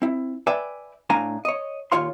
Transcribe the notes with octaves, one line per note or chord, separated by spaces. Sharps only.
C4 E4
B4 D5 E5 G5 G#5
A2 D4 F5 G#5 A#5
C#5 D#5
D#2 A#2 F4 C#5 F5 C6